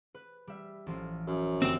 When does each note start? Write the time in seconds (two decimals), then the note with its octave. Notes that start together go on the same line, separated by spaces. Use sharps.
0.14 B4
0.47 G3 E5
0.86 A1 F3 F4
1.27 F#2
1.62 G1 C4 G5